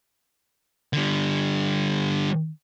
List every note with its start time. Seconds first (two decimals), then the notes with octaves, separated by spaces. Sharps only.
0.93 D3 G3